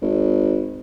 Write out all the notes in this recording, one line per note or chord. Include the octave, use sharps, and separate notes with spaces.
G#1